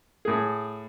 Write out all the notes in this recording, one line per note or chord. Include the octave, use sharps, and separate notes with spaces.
A2 G#4